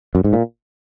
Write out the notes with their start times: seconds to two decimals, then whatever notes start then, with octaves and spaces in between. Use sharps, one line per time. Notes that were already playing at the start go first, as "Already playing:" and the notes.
0.15 F#2
0.24 G#2
0.33 A#2